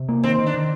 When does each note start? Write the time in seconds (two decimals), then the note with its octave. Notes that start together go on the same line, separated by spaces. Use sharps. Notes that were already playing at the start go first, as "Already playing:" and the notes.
Already playing: C3
0.09 A#3
0.23 D#3 C4
0.39 D#3
0.46 D4
0.54 D#3